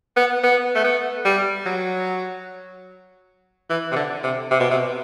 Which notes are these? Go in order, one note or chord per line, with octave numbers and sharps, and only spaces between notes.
B3
B3
A3
B3
G3
F#3
E3
C3
D3
C3
C3
B2
C3